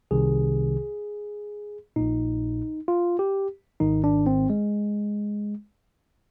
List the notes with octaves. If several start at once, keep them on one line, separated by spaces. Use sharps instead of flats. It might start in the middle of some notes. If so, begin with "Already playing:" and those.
C2 C3 D#3 G#4
A#1 A#2 D#4
F4
G4
G#1 G#2 D#3 D#4
D4
C4
G#3